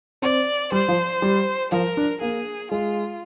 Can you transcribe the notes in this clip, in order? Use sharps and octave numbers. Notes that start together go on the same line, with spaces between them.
C4 D5
G3 C5
F3
G3
F3 A#4
D4
A#3 G#4
G#3 F4